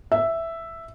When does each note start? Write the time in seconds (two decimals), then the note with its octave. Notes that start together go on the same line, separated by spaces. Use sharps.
0.12 E5